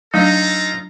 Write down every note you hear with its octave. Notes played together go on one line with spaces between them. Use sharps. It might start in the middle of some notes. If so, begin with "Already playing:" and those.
F#3 A3 D4 D#4 F4 A4 A#5